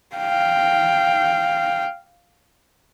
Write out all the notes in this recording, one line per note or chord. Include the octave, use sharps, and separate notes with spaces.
F5 G5